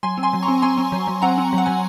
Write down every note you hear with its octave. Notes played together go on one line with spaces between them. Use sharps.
F#3 G#5 C6
C4
G#5 C6
F#3
A#5 C#6
C4
C4 G#5 C6
C4
F#3
F#3
C4 F#5 A#5
C4
F#3
F#5
F#3 G#5